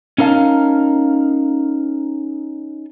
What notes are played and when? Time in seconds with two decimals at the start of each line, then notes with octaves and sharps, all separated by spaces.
0.18 C#4 D#4 A#4 F5 A5